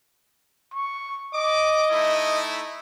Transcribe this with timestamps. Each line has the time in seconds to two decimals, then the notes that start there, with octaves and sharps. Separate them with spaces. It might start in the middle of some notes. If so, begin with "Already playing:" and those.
0.73 C#6
1.34 D#5 D6
1.91 A3 D#4 E4